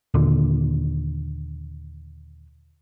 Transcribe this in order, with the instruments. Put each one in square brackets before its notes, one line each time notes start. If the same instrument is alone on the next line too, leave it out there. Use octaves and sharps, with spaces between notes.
[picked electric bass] D#2 A#2 D3